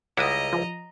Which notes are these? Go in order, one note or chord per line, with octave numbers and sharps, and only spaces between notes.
C#2 G3 E4 D#5 F#5 A#5 D#6
F3